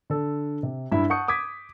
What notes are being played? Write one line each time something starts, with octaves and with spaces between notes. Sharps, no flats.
D3 A4
C3
G2 E4 E5
F#5 A5 C#6 D#6 G6 C#7
D6 D#6 G#6 B6